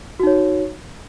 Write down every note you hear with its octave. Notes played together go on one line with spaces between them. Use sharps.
D#4 F#4 C#5